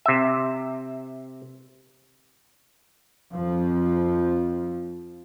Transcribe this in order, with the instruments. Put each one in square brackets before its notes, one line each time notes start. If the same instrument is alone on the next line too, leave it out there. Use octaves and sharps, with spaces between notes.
[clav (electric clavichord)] C3 E5
[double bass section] F2 F3